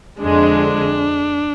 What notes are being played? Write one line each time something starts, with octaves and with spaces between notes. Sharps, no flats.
F2 D3 G#3 D4